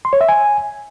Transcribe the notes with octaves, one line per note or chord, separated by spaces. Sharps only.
C6
C#5
E5
G#5